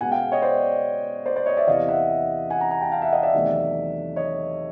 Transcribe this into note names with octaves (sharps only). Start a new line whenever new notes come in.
B2 G#3 F#5 G#5
F5 G5
C#5 D#5
C5 D5
C5 D5
C5 D5
C#5 D#5
D5 E5
E2 C3 E3 D#5 F5
E5 F#5
F#5 G#5
G#5 A#5
G#5 A#5
G5 A5
F5 G5
E5 F#5
D#5 F5
D5 E5
E2 C3 D#3 F#3 A3
C#5 D#5